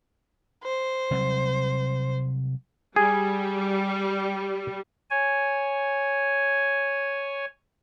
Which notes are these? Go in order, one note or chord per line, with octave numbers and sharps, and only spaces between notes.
C5
C3 F#3 G3
G3 G#4
C#5 G#5